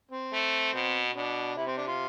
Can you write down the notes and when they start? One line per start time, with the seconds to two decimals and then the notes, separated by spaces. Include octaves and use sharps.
0.12 C4
0.33 A3
0.74 B2
1.15 B2 D4
1.56 C3 E4
1.67 C4
1.78 D4
1.88 F4